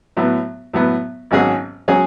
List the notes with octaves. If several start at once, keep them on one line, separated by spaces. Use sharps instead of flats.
A2 F#3 B3
A2 F#3 B3
G#1 G#2 F#3 C#4 G#4
F#3 C#4 G#4